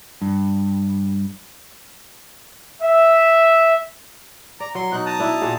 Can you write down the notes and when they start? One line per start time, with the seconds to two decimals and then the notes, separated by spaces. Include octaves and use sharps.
0.22 G2
2.82 E5
4.60 D5 A#5
4.75 F#3 C6
4.92 B2 D#4 F#6
5.06 A5 A#5 D#6
5.20 D4 E4 D#5
5.42 A#2 F#4 G#4